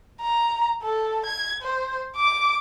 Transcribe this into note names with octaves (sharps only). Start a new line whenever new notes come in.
A#5
A4
G#6
C5
D6